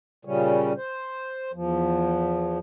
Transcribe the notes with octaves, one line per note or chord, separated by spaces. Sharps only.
A#2 C#3 G3 C#4
C5
E2 F3